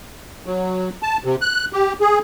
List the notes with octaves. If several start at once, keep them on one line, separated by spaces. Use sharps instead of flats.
F#3
A5
C3
F#6
G4
G#4